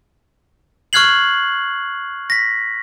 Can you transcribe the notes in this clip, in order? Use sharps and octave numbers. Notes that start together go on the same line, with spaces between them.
C#6 F6 F#6 G#6 C7 F#7
A#6 B6